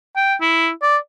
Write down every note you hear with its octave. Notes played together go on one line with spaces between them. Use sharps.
G5
E4
D5